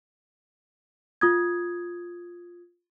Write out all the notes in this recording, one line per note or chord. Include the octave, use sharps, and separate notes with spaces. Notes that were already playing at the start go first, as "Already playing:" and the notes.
F4 D#6 G#6